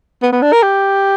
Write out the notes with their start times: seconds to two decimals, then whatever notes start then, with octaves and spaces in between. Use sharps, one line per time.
0.22 B3
0.32 B3
0.42 D4
0.52 A#4
0.63 G4